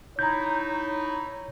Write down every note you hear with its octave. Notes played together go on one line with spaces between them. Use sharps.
D#4 E4 C#5 A#5 G6